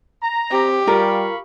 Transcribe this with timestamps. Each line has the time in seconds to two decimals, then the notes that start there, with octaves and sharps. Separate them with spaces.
0.22 A#5
0.51 C4 G4
0.87 G3 F4 A#4 F5 B5 C#6